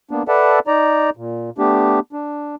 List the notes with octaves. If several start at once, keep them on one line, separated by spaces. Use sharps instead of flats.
A#3 B3 D4
A4 B4 D5 E5 F#5 A5
D#4 D5 A#5
A#2
A3 B3 D4 G4
D4